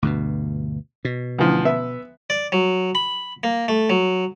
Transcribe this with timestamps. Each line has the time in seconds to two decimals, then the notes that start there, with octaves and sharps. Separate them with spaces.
0.02 D2 G2 B2
1.05 B2
1.38 D2 E3 F3
1.65 B3 E5
2.30 D5
2.52 F#3
2.95 B5
3.44 A#3
3.68 A3
3.90 F#3